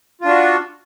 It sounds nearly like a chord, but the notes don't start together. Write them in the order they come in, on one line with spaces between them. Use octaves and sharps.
F4 D4 F#4